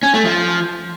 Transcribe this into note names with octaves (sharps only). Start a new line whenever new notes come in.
C#4
A3
F3